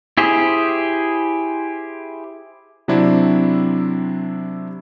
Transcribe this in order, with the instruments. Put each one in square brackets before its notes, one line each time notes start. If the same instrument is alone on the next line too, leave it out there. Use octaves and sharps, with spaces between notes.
[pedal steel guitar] E4 G4 G#4 C5
[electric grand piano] C3 F#3 C4 D4 E4